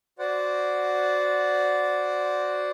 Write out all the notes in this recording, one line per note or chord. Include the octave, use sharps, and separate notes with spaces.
F#4 C5 D5 F#5